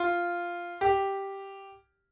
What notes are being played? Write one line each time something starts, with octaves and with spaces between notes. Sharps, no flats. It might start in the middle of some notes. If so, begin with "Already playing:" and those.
Already playing: F4
G4